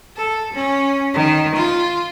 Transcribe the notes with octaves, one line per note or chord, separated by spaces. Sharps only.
A4
C#4
D#3
F4